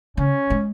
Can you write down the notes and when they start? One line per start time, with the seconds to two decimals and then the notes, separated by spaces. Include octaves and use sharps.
0.17 C#3 C#4
0.50 G#3